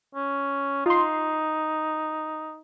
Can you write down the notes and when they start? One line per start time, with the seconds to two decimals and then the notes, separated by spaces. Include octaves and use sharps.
0.15 C#4
0.86 D#4 F4 C6